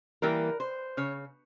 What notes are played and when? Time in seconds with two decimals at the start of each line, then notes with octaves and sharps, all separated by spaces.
0.22 E3 G3 A#3 A#4
0.60 C5
0.97 C#3 C#5